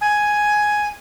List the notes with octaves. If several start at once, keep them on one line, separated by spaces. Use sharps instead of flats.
G#5